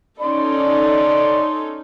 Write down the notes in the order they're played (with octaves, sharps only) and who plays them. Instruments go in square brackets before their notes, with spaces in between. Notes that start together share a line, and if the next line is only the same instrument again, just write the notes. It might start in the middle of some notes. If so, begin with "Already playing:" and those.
[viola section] C#4 D#4 A4 [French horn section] D5 [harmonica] C6